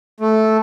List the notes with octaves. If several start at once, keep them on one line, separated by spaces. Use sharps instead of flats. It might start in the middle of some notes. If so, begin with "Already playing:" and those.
A3